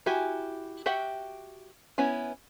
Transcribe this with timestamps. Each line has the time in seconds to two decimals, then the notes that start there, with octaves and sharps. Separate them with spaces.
0.06 E4 F#4 G4 E5 G#5
0.86 F#4 G4 E5 F#5 G5
1.98 B3 C#4 E4 G#5